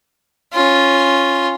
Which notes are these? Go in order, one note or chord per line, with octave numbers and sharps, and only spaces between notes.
C#4 F4